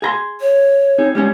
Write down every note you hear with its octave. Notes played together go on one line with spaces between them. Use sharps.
G#4 A#5 C6
C#5
C4 D#4 G#4
G3 G#3 C#4